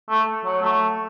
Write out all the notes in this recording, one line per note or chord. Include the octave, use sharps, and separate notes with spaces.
A3
F#3
A3